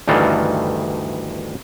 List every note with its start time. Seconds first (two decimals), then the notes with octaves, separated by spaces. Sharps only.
0.08 D2 G2 D#3 E3 A4 F5